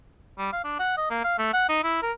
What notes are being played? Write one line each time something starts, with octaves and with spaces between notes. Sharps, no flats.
G3
F5
D4
F#5
D#5
A#3
F5
A3
F#5
D#4
E4
A#4